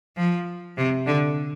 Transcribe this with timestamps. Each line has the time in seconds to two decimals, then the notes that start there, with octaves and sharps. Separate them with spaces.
0.17 F3
0.77 C3
1.06 D3